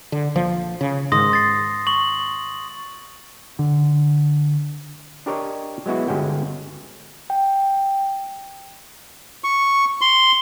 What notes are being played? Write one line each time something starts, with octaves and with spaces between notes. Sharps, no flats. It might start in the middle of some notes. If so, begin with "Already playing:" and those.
D3
A#1 F3
C#3
G#2 D#3 C6 D#6 A#6
A6 C7
C#6 F#7
D3
D4 G4 A#4 C#5 D#5
F#3 G#3 B3 E4 F#4
G1 G2 G#3 C#4 F#4 G5
G5
C#6
C6